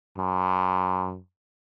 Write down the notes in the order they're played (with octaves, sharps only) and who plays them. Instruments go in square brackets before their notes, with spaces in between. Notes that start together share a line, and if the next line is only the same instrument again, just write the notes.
[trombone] F#2